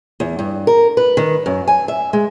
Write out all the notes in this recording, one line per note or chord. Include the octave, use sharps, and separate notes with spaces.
E2
G2
A#4
B4
D#3
F#2
G#5
E5
G#3